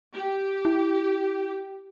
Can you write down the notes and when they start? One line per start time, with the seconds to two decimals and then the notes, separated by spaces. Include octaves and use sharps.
0.14 G4
0.65 E4